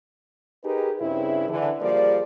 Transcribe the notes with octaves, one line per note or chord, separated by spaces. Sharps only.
D#4 G4 G#4 A#4 B4
G2 C#3 C4 E4
D3 E3
F3 G3 A#3 G#4 D5